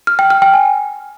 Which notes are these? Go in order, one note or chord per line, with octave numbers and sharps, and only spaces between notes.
F6
G5
F6
G5
G#5